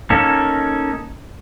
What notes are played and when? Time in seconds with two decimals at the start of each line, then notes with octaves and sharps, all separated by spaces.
0.10 A#3 C#4 D#4 A4